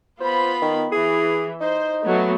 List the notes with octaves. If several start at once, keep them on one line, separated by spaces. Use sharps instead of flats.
B3 F4 C5 B5
D#3
E3 G#4
D#4 C5
F#3 A3 B3